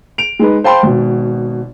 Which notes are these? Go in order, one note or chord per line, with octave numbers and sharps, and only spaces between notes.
D7 F7
G#3 D#4 B4
C5 F5 G5 A5 B5 C6
G#1 B2